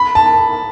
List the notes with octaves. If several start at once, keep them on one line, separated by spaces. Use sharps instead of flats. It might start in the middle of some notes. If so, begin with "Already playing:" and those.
Already playing: B5
A5